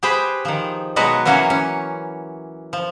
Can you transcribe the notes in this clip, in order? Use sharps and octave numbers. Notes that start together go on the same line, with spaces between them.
G4 G#4 B4 C5 G5
D#3 F3
B2 F#3 G#3 F#4 B4 D#5
E3 F#3 A#3 C#4 F#4
C#4
F3